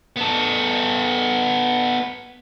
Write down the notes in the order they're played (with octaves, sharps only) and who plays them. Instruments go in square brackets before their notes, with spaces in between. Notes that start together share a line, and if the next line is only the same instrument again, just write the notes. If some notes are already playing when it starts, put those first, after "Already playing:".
[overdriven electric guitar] B3 A4